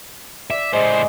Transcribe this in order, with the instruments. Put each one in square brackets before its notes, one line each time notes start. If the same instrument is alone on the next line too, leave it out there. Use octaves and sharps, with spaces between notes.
[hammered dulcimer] D5 [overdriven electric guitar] E5
[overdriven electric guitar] A2 C5 [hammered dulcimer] G#3